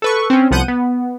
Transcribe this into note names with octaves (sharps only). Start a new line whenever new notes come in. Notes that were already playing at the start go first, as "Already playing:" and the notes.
A4 B4 C#6
C4 C#4
C2 F3 B3 F#5 G6 D#7
B3